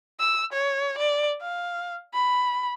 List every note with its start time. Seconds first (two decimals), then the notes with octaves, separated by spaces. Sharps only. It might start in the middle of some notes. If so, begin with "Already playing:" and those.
0.20 E6
0.53 C#5
0.98 D5
1.42 F5
2.14 B5